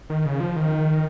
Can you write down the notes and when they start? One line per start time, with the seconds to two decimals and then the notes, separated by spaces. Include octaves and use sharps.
0.10 D#3
0.26 C#3
0.40 F3
0.56 D#3